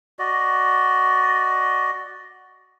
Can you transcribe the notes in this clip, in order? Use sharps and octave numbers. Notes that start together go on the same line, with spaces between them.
F#4 D5 D#5